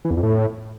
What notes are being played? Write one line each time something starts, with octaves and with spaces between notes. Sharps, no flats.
E3
E2
F2
A2